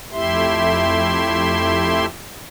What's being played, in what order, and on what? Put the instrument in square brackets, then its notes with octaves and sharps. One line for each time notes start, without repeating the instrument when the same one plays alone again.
[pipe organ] F2 A3 E4 G4 E5 C6